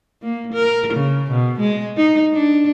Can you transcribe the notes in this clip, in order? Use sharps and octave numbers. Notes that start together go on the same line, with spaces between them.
A#3
A#4
C#3
B2
G#3
D#4
D4